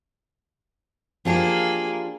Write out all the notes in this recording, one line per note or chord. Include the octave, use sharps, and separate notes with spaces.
F3 A#3 D4 G4 G#4